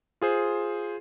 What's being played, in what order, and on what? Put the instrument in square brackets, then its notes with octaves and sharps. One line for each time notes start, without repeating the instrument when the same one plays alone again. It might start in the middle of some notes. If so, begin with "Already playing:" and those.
[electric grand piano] F4 G#4 C5